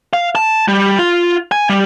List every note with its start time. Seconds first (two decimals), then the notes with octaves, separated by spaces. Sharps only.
0.13 F5
0.35 A5
0.68 G3
0.99 F4
1.52 G#5
1.69 G3